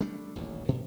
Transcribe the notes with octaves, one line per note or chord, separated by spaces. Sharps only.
G3 A3 D4
D#1 A1 D2
A#2